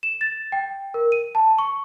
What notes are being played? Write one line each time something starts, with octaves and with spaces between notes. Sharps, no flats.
E7
A6
G5
A#4
D#7
A5
C#6